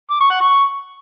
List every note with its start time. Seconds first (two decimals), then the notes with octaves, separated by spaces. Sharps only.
0.10 D6
0.20 C#6
0.30 F#5
0.41 C#6